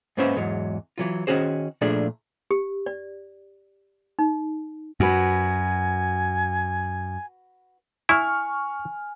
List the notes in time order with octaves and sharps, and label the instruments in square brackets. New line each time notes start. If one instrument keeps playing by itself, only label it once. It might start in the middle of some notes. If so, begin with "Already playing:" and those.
[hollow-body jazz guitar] G#2 A#3 B3 C#4 C5 E5
E2 G#2 F#3
E3 F#3 F4
D#3 C#4 F#4 G#4 C5
A#2 F3 A3 D4 G#4
[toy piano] G4
D5
D#4
[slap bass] F#2 [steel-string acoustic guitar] F#4 B4 [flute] G#5
[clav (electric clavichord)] E4 [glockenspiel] G#5 [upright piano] C#6 F6